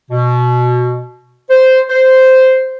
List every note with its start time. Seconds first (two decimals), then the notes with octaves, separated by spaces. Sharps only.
0.11 B2
1.50 C5
1.90 C5